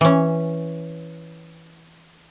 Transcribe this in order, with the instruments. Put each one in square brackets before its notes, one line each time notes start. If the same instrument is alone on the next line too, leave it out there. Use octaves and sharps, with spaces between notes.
[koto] E3 C#4